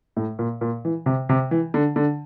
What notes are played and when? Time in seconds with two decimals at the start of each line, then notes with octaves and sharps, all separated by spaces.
0.17 A2
0.39 A#2
0.61 A#2
0.85 E3
1.06 C3
1.29 C3
1.51 E3
1.74 D3
1.96 D3